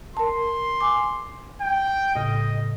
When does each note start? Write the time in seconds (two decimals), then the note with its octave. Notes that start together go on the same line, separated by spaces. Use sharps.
0.17 A#4 A5 C6
0.80 G#5 D6
1.61 G5
2.15 A2 C#3 D#5